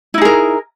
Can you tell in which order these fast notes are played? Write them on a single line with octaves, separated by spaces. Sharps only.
E4 D#4 G#4 A#4